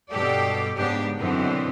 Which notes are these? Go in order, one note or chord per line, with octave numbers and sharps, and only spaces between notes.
G2 B2 G4 A4 D5
G#2 C#3 B3 D4 G4
F#2 B2 D3 E3 B3 C4